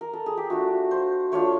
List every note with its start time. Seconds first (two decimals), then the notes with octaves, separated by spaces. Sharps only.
0.01 A#4
0.13 A4
0.26 G#4
0.37 G4
0.50 A3 D4 F4 F#4
0.91 C5
1.32 A3 D4 F4 C#5